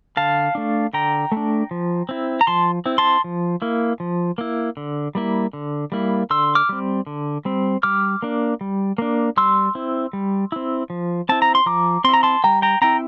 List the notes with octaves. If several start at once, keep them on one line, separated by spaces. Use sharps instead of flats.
D3 F5 A5
A3 D4
D3 G5 A#5
A3
D4
F3
C4 E4
A#5
F3 A5 C6
C4 E4
A5 C6
F3
A#3 E4
F3
A#3 E4
D3
G3 A#3 E4
D3
G3 A#3 E4
D3 C6 E6
D6 F6
G3 C4
D3
G3 C4
G3 D6 F6
A#3 D4
G3
A#3 D4
G3 C6 E6
C4 E4
G3
C4 E4
F3
C4 E4 A5
A#5
C6
F3 A#5 D6
C4 E4 A#5 C6
A5 C6
G3 G5 A#5
G5 A#5
C4 E4 G5 A#5